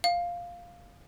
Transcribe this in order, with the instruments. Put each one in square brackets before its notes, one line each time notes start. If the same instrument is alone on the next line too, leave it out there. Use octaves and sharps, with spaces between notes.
[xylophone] F5